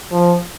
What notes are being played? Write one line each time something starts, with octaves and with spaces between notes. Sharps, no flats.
F3